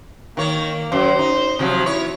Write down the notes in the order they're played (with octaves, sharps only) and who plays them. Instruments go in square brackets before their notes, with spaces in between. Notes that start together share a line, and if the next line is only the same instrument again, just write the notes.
[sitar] D#3 C#5 [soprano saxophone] A#3
[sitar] F#2 [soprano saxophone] C5
[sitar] D#4
C3 F3 F#3
[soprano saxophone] E4 [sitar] C#5